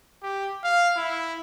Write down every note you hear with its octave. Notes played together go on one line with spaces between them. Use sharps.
G4
F5
E4